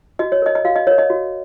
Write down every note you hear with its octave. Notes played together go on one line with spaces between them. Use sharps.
F#4 D#5
C#5
A#4 C#5 D#5
D#5
F#4 F5
D#5
A#4 C#5
D#5
F#4